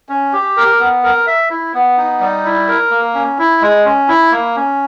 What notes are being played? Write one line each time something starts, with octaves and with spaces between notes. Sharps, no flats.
C#4
G4
A#4
B3
A#4
E5
E4
B3
D#4
G3
E4
A#4
A#3
C#4
E4
G#3
C#4
E4
A#3
C#4